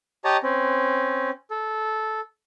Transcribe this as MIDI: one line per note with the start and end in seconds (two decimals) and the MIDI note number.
0.24 0.37 67
0.24 0.37 73
0.24 0.37 75
0.24 0.37 81
0.24 0.37 82
0.43 1.30 60
0.43 1.30 61
1.51 2.20 69